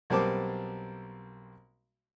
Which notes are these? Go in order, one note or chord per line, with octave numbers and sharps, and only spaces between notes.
B1 G3 A#3 C4 A5 D6